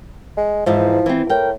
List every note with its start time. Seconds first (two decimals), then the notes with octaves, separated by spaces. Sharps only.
0.37 G#3
0.66 G#2 E3 F3 D#4
1.06 E3 C4
1.29 A2 A#4 G5